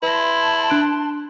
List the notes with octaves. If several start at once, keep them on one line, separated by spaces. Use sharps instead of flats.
E4 B4 A5 C6 A#6
D4 F#6 D7